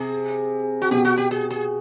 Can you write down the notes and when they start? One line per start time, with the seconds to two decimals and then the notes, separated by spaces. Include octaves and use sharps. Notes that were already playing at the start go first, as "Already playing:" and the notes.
Already playing: C3 G#4
0.82 F#4
0.91 B2 G4
1.05 F#4
1.18 G4
1.31 G#4
1.50 G#4